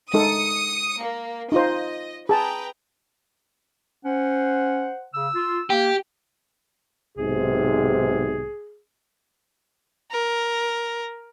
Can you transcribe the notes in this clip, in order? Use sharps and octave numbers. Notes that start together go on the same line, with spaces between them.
G#3 D#4 A4 D#6 C#7
A#3
D#4 F4 C5 D#5
G#4 B4 G5 A5 A#5
C#4 C5 F#5
C#3 E6
F4
A#3 G4
B1 G#2 C3 G#4
A#4